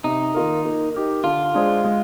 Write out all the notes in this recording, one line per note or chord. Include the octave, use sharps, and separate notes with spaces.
C3 D#4
D#3 A#3 F4 A#4
A#3
D#4 G4 A#4
D3 F4
G#3 D4 G#4 C5
G#3